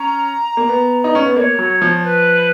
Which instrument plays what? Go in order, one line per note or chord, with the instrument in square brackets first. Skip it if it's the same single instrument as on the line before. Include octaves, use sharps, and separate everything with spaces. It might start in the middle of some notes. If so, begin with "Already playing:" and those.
Already playing: [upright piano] C#4 [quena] A#5
[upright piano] A#3
B3
D#4
C#4
B3
[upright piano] A#3 [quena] D#5
[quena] C#5
[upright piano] F#3
F3
[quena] B4